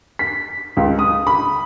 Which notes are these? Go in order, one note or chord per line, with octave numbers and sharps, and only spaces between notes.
B6
C#2
D#6
B5